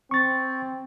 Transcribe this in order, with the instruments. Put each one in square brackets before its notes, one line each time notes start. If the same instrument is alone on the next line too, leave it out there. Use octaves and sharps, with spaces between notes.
[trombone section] C4 [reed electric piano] C#6 A6